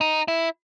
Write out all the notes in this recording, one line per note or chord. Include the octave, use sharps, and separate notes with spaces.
D#4
E4